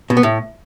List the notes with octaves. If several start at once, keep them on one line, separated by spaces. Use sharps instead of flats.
B2
B3
A2